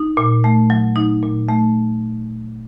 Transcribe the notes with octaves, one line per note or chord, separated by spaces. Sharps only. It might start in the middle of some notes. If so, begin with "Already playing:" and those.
Already playing: D#4
A#2
A3
F#3
D#4
A#2
A3